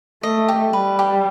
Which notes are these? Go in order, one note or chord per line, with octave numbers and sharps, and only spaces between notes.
A3 D#5
G4
G3 B4
G4